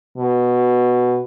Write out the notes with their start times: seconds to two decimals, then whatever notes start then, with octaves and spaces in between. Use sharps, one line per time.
0.18 B2